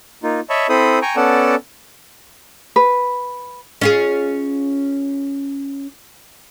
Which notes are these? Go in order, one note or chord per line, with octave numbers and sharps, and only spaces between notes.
A#3 D#4 F4
C#5 D#5 E5 A5 B5 C#6
C4 E4 A4 C5 B5 D#6
G5 G#5 A#5 C#6
B3 C#4 A4 D5 F#5 A5
B4
C#4 F4 G#4